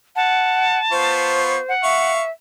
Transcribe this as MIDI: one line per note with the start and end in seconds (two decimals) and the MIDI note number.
0.16 0.79 78
0.16 1.43 81
0.91 1.58 59
0.91 1.58 65
0.91 1.73 72
0.91 1.58 85
1.69 2.12 78
1.83 2.30 76
1.83 2.22 77
1.83 2.22 85